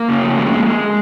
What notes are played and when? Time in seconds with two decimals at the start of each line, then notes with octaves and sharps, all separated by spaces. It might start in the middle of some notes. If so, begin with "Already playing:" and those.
Already playing: A#3
0.09 C#3
0.23 F2
0.37 G#3
0.53 G#3
0.66 G#3